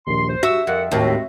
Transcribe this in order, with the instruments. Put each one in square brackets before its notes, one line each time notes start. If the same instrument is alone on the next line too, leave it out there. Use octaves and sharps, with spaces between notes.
[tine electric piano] A#1 D#2 [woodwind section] C6
[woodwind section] C5
[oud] F#4 [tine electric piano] E5 [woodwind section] E6
[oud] F2 [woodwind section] A#4 F#5
[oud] D#2 A2 [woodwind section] G#3 C4 F#4